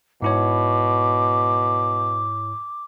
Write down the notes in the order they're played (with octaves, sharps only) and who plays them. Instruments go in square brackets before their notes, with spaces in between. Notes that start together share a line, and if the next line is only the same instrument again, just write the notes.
[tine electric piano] G#2 E4 C#5 [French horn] B2 [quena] D6